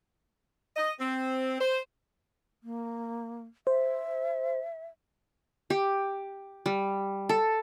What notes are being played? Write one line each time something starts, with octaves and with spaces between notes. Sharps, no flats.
D#5
C4
C5
A#3
C5 E5
G4
G3
A4